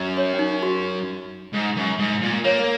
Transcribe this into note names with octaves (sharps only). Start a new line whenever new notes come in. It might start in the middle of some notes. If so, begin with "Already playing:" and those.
Already playing: F#2
C#5
C#4
D#4
F#4
G#2
F#2
G#2
A#2
A#3 C#5
A#4